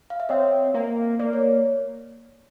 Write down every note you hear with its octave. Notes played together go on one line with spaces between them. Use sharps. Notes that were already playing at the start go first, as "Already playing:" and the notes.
F5
E5
C4 C#5 D#5
A#3
A#3 D5
C#5